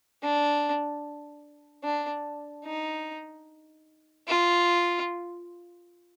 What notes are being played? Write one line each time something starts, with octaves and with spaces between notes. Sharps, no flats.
D4
D4
D#4
F4